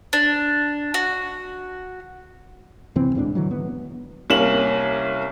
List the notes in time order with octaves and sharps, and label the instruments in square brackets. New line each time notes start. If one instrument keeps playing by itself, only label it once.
[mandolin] D4
F#4
[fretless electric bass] C#2 C3 E3 C4
D#1 G#2 C4 D4
D#1 D3 E3 F#3
B3
[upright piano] C2 A#3 C#4 E7 F#7